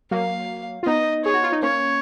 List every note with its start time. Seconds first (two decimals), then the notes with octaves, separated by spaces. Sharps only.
0.11 F#3 A#3 F5
0.83 F4
0.86 B3 D#4 D#5
1.24 G#4 C#5
1.34 F#4
1.43 F4
1.52 D#4
1.62 A#3 C#4 C#5